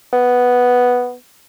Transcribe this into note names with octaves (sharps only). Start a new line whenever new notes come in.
B3